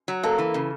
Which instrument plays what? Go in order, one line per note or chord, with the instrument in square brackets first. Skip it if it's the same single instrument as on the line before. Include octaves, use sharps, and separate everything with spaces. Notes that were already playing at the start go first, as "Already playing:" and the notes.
[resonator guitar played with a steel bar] F#3
[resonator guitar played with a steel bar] A#3 [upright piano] A4
[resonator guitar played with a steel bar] E3
C#3